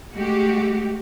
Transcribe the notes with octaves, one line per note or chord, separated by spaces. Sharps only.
G#3 A3 F#4 G4